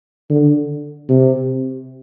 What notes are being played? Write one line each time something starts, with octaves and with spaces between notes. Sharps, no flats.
D3
C3